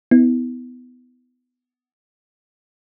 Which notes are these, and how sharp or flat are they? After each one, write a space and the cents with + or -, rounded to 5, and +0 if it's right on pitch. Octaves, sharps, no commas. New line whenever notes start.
B3 +20 E4 -25